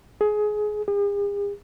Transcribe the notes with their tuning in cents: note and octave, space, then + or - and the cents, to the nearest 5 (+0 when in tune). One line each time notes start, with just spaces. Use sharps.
G#4 +20
G#4 -45